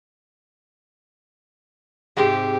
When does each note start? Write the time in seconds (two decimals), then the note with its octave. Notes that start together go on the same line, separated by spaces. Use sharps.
2.17 G#2 C3 G#3 G4